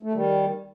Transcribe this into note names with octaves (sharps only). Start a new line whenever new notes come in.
A3
D#3 G3